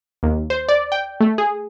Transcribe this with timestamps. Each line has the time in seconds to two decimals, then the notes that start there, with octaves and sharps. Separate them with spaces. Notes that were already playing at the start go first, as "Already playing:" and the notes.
0.23 D#2
0.50 C5
0.68 D5
0.92 G5
1.21 A3
1.38 G#4